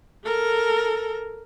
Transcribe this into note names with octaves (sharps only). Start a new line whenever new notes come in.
A4 A#4